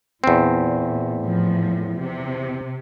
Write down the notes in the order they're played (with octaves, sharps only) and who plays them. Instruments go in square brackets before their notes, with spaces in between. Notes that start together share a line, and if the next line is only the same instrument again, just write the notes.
[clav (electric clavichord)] E2 C4 [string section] A#2
[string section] A2 F3
C3